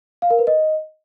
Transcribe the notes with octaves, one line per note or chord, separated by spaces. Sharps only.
F5
A#4
B4
D#5